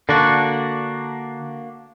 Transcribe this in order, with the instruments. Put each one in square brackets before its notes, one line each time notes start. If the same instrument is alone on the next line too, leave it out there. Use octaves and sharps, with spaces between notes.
[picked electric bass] D3 [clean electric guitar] A#3 D4 F#4